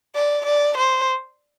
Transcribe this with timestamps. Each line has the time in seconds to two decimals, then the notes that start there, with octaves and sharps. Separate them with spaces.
0.15 D5
0.46 D5
0.77 C5